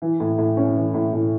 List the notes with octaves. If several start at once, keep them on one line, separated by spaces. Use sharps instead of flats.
E3
A2
A2
C#4
E3
A2
A2